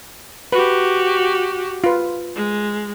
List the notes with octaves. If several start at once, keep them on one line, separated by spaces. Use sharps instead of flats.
F#4 G4 B4
F4 B4
G#3